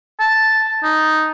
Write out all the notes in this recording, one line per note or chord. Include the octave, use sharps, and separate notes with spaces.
A5
D#4